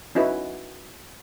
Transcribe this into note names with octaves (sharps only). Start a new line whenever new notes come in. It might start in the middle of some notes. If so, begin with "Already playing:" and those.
C#4 D#4 E4 F#4 B4